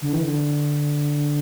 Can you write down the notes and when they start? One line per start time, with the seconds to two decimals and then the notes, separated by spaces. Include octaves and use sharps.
0.02 D3
0.13 E3
0.23 D3